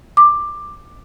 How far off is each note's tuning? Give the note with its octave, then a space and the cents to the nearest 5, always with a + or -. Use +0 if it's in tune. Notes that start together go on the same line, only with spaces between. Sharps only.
D6 +10